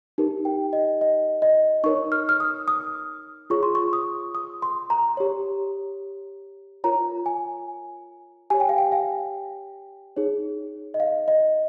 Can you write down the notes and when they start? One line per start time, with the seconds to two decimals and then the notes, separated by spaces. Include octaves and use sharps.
0.18 D#4 G4 A#4
0.45 G5
0.73 D#5
1.01 D#5
1.42 D#5
1.84 D#4 A#4 C#5 C#6
2.12 F6
2.29 F6
2.40 D#6
2.68 D#6
3.50 F4 G#4 C#5 C#6
3.63 C6
3.75 C#6
3.93 D#6
4.35 D#6
4.62 C6
4.90 A#5
5.17 G4 C#5
6.84 F4 A#4 C#5 A#5
7.26 G#5
8.50 G4 C#5 G#5
8.60 G5
8.69 F5
8.78 G5
8.92 F5
10.16 D#4 G#4 C#5
10.94 D#5
11.00 F5
11.28 D#5